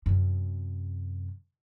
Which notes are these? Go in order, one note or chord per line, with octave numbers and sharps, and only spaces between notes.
F#2 C3